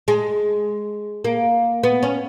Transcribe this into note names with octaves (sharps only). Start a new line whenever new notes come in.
G#3
A#3
B3
C#4